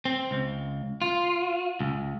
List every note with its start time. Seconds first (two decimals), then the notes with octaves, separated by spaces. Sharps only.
0.05 C4
0.31 C#2
1.02 F4
1.80 C#2